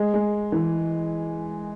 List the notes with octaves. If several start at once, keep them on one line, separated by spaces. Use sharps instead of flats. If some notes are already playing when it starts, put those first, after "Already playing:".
Already playing: G#3
G#3
E3